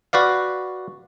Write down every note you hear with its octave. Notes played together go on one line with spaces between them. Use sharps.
F#4 B4 D5 F5